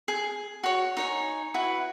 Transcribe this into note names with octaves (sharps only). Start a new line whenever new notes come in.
G#4
F#4 C#5
D#4 C#5 G#5
E4 F#4 B4